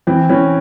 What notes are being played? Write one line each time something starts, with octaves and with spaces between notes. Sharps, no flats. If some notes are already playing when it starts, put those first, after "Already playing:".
E3 C4
E3 C#4